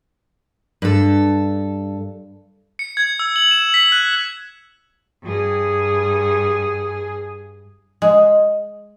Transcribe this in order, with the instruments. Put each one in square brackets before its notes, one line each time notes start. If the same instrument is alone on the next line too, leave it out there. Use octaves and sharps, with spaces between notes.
[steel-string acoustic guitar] G2 A4
[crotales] C#7
G#6
E6
F#7
E7
B6
F#6
[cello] G2 G#4
[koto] G#3